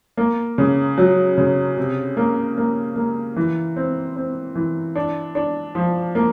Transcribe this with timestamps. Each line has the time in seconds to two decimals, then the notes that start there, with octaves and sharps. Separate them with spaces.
0.17 A#3
0.58 C#3
0.98 F#3
1.38 C#3
1.77 C3
2.17 A#3
2.57 A#3
2.96 A#3
3.36 E3
3.76 C4
4.16 C4
4.55 E3
4.95 D4
5.35 D4
5.75 F3
6.15 A#3